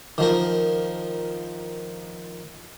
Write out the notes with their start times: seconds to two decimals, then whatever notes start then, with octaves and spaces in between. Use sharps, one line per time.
0.18 D#3 F3 A#4